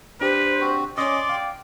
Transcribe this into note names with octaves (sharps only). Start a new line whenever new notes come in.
D4 G4 B4 C5
C4 F#4
C#4 D5 D#5 C6 D6
F5 G5